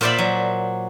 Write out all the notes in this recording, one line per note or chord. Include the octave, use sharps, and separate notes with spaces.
A#2 F4 C5 D5 E5 B5
F#3